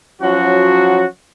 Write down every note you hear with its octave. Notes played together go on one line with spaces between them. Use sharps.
F3 F#3 C#4 F#4